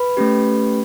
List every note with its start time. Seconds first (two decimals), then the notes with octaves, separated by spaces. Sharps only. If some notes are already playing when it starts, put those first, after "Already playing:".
Already playing: B4 B5
0.17 A3 C#4 G4